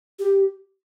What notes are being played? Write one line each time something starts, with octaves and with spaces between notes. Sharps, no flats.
G4